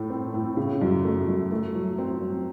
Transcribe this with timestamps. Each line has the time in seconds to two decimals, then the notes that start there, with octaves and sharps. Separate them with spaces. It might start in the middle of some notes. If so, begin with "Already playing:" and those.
Already playing: A2 A3
0.10 C4
0.34 A2
0.57 C#3
0.81 F#2
1.05 A3
1.28 F#2
1.51 A3
1.75 F#3
1.98 C4
2.21 F#3